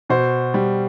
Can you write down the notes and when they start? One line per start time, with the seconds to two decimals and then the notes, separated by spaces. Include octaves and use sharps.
0.09 B2 C5
0.54 G3